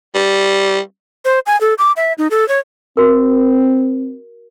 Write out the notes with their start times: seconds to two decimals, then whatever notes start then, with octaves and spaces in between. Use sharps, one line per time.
0.15 G3
1.25 C5
1.46 G#5
1.61 A4
1.78 D6
1.97 E5
2.18 D#4
2.31 A4
2.48 C#5
2.97 C4 F#4 A#4